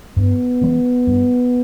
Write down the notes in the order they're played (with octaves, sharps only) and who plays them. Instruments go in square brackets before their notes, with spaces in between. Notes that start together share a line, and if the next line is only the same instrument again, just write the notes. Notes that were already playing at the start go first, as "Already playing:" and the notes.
[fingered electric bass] G2 [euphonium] B3
[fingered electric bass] E3 G#3 C#4
G2